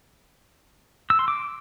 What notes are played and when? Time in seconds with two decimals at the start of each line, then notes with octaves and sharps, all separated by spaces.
1.10 E6
1.19 C6
1.28 D6